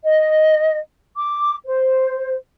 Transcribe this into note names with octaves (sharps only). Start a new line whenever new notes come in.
D#5
D6
C5